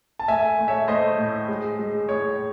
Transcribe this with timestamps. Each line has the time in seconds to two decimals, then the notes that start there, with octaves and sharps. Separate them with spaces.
0.19 A5
0.28 A3 E5 G#5
0.58 A3
0.68 C#5 E5
0.88 A3 C5 D#5
1.18 A2
1.48 G#3
1.79 G#3
2.09 A2 C#5